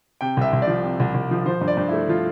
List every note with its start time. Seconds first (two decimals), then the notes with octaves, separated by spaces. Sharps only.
0.21 C3 G5
0.37 C2 E5
0.53 C2
0.62 D5
0.68 F3
0.83 C3
1.00 C2
1.14 C2
1.31 F3
1.46 F3 C5
1.61 G2
1.68 D5
1.77 G2
1.89 A3 E4
2.09 F3 F4